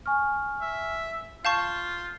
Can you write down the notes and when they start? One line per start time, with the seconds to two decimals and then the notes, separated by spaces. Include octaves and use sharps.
0.06 G#5 C#6 F6
0.61 E5
1.45 F4 F5 A5 C#6 G6